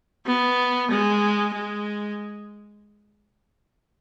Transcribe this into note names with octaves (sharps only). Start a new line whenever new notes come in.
B3
G#3
G#3